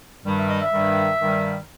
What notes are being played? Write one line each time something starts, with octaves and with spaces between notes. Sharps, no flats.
G2 D#3 G3
E5
D#5
E5
G2 D#3 G3
G2 D#3 G3